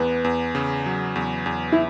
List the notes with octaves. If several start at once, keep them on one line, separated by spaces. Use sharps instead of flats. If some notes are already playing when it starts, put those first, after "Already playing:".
Already playing: E2 B3
E2
C#3
F#3
E2
E2
E4